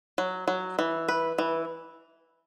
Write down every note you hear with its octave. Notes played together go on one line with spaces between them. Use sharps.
F#3
F#3
E3
B4
E3